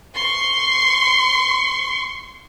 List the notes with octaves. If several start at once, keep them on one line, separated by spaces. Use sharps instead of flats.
C6 C#6